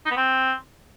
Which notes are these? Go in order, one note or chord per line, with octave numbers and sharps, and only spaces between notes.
D#4
B3
C4